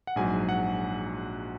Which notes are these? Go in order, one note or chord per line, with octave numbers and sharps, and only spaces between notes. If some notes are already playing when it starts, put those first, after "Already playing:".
F#5
A#1 G#2 F#3 G#5
F#5